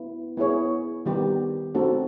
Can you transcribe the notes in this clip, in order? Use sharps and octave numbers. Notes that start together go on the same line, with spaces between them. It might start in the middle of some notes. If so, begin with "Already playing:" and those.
Already playing: B3 E4
B3 E4 G#4 C#5
D#3 G3 B3 D#4 G4
A3 C4 D#4 F#4 A4